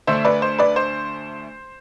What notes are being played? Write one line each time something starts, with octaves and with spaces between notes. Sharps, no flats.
D2 D3 A3 D4 C5 E5
B4 D5
C5
B4 D5
C5